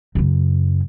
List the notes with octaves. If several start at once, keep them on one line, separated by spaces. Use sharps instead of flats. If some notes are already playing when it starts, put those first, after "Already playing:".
F#2 C#3